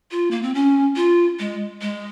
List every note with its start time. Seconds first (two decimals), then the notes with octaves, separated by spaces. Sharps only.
0.11 F4
0.31 A#3
0.43 C4
0.55 C#4
0.96 F4
1.39 G#3
1.82 G#3